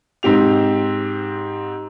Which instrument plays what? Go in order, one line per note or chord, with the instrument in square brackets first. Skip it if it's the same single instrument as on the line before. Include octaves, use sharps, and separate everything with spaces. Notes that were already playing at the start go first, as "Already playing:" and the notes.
[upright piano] G#2 C4 G4 F7